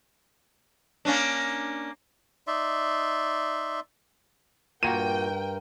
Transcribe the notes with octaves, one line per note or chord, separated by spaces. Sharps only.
A#3 C#4 D4
D#4 D5 E5 C6
G2 A#2 A#3 F#4 A#4 G5 D#7